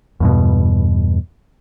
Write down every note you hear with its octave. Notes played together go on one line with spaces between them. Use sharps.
E2 G2 B2